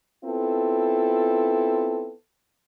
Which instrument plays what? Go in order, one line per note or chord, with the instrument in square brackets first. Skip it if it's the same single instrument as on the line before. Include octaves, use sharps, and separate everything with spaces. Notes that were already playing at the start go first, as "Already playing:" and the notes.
[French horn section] B3 C4 E4 F4 A4